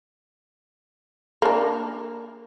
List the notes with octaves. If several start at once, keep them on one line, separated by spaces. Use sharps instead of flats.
A#3 D4